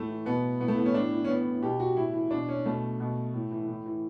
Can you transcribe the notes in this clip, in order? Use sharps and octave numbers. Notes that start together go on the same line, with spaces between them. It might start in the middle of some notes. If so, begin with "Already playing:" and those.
Already playing: A2 A3
E3
B2 B3
A2 B3
A3
E3 B3
C#4
A2 D4
E3
C#4
A2 B3
E3
B2 G4
F#4
A2 E4
E3
B2 D4
C#4
B2 A3
B2
A2
E3
A2
E3